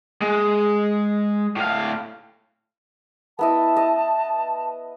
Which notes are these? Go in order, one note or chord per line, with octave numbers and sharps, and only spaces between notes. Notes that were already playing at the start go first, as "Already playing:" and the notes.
G#3
A2 F5
B3 E4 D#5 A5
D#5